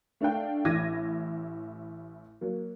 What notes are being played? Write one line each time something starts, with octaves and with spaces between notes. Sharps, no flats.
A3 D4 A4 F5 G5
A1 E4 D6 G#6 A#6 D#7
F#3 A#3